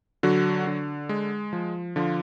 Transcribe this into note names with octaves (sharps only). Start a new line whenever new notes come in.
D3 F#3 F#4
D3
G#3
F3
D3 F3 F4